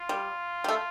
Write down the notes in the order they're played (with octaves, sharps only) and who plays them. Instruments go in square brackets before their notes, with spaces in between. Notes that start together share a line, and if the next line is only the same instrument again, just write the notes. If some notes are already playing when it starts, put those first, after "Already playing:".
Already playing: [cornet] F4
[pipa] G3
G3
A3